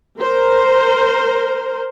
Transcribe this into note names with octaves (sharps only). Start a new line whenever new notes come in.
A#4 C5